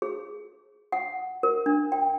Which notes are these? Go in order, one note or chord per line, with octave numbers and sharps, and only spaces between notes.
G#4
F#5
A#4
D4
G5